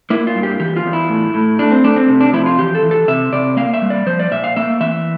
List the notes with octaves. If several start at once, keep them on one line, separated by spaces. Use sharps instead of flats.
A#3 E4
F4
G2
G4
E3 G4
F4
E2
E4
A2
A2
A3 D4
C4
A3 D4
C4
C3
D4
F3 E4
F4
E3 G4
A4
E3
A4
C3 E5
C3 D5
A#3 F5
E5
G3
D5
F3 C5
D5
A#2 E5
F5
A#3 E5
E3 E5